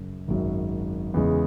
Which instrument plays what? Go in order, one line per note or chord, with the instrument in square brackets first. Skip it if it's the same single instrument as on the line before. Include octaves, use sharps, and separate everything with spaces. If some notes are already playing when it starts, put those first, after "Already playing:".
Already playing: [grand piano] F#2 C#3
G#1 F#2 F#3
E2 C#3 G#3